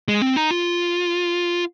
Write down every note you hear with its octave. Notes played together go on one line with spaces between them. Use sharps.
G#3
C4
D#4
F4